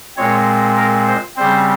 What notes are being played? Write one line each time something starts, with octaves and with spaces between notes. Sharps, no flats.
A#2 G#3 C4 C#5
A#4
C5
C#3 G3 C4 C5